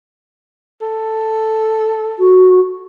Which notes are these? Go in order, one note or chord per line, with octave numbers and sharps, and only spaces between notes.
A4
F#4